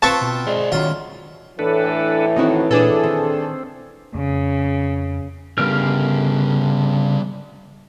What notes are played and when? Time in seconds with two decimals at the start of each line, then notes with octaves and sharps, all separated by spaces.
0.02 C4 F4 B4 A5 C#6 A6
0.21 B2
0.47 G#3 C5 D5
0.72 D#3 F#3 C#4 F4
1.59 A2 E3 D4 A4 B4
2.36 D#3 C4 D#4 E4 F#4
2.71 A#2 D4 G#4 A4 B4
3.04 D#3 C4
4.15 F2 C#3
5.58 C#3 G3 B3 A#4 F6